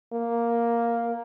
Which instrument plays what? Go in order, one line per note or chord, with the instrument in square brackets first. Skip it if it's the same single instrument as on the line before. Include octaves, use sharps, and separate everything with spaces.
[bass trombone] A#3